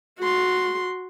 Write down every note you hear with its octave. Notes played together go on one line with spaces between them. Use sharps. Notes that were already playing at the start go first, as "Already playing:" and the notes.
F#4 C6